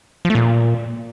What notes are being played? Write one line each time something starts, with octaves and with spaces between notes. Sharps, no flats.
F3
A3
A#2